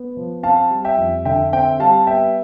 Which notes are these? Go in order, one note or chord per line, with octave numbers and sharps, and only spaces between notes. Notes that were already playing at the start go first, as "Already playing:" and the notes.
Already playing: B3
F3
C4 F5 A5
G3
E5 G5
F2
D3 E5 G5
C4 E5 G5
G3 F5 A5
B3 E5 G5